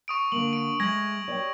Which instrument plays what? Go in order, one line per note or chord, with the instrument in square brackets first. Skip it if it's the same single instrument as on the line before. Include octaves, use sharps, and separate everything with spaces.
[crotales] C#6 D#6 D7
[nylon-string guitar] D3 A#3 [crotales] F#7
[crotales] D7
[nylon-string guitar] G#3 A3 [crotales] G#6 A#6 F#7
[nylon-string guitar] G4 C#5 D5